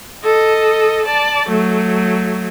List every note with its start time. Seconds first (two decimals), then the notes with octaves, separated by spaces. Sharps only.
0.24 A4 D#5
1.06 D5 A5
1.49 F#3 A3